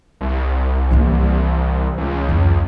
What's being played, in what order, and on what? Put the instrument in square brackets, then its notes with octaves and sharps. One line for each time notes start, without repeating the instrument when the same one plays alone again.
[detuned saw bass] C2
[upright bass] E3 A#3
[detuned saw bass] C#2
[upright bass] F2